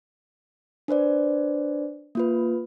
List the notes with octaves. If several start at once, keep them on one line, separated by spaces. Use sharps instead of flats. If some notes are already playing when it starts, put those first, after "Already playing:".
D4 B4 C5 D5
A#3 F4 B4